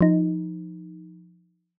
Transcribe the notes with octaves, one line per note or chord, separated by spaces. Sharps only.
F3 D#4